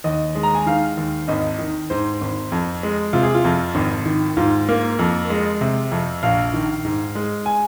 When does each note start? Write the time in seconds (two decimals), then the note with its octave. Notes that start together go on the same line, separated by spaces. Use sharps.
0.04 D#2 D#5
0.35 G#3
0.43 A#5
0.55 G#5
0.66 D#3 F5
0.97 D#2
1.28 G#1 D#5
1.59 D#3
1.90 G#2 C5
2.21 G#1
2.52 F2
2.83 G#3
3.13 C3 F4
3.23 G#4
3.34 F4
3.44 F2
3.75 G#1
4.06 D#3
4.37 G#2 F4
4.69 A#3
4.99 F2
5.30 G#3
5.61 C3
5.92 F2
6.23 A#1 F5
6.54 D#3
6.85 G#2
7.15 G#3
7.46 G#5